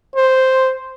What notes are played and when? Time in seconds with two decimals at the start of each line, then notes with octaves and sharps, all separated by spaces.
0.15 C5